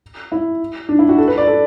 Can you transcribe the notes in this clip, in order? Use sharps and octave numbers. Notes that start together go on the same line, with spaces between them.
E4
D4
E4
F#4
A4
B4
D5
A4